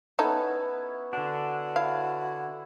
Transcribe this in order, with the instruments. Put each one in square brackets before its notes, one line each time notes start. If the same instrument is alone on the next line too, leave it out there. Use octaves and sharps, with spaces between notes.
[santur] B3 C#4 E4 [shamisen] D#4 A4
[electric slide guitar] D3 D4 [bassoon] F#4
[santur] E4 [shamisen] F5